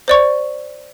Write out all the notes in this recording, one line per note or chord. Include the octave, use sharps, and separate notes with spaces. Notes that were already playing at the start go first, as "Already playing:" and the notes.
C5 D5 C#6